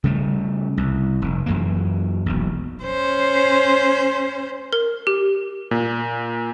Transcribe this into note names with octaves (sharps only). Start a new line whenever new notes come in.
C#3 G3 A3
C2
F1
F#2 E3 A#3
E1 B1
C#4 C5
A#4
G4
A#2